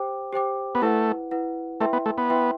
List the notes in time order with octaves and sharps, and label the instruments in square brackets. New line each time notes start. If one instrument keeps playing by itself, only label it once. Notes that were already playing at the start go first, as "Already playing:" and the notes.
Already playing: [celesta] G4 C5 G5 D6
G4 C5 G5 D6
[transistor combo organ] B3
[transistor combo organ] A3 [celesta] E4 B4 F#5
[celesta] E4 B4 F#5
[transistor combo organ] A3 [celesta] E4 B4 E5 G5 C6
[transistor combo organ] B3
A3
B3
[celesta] E4 B4 E5 G5 C6